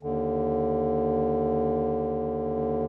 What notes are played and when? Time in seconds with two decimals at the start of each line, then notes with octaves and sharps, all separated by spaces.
0.03 D#2 D3